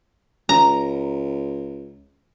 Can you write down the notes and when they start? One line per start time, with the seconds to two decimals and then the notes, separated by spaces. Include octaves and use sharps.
0.49 C#2 A#5